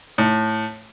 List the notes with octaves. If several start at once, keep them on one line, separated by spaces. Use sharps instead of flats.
A2